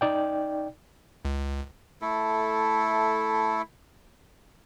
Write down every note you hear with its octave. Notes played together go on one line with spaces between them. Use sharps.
D#4 D5 G5
C#2
A3 E4 A4